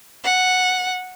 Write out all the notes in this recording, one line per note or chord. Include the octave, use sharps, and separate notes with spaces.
F#5